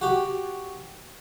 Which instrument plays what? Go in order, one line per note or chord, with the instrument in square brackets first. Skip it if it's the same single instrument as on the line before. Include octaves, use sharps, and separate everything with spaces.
[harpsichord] F#4 G4